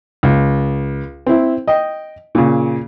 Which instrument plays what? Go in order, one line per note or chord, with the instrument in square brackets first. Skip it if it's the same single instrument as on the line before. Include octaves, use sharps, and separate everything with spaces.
[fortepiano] C#2
C4 E4
D#5 G5
A#2 C#3